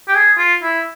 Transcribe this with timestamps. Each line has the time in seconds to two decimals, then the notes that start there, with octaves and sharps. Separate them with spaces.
0.08 G4
0.15 G#4
0.38 F4
0.63 E4